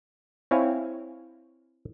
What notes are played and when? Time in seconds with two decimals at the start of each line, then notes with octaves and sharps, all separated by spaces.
0.51 C4 E4 C#5 F5 G#5